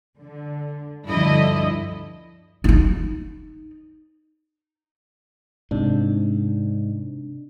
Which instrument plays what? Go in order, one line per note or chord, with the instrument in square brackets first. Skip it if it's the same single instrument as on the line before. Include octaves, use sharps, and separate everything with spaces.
[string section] D3
D2 G2 D3 F3 E4 D#5
[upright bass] D#4 E4
[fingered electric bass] G#2 [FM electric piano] C3 D4